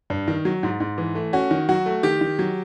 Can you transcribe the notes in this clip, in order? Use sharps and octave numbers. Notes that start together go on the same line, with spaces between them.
G2
D#3
F#3
G#2
G#2
E3
A3
C#4 F#4
D#3
F#3 F#4
A3
D#3 G4
D#3
F#3